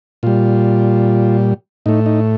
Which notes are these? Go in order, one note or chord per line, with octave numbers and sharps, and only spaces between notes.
A#2 G3 F4
A2 A3 D#4
D#4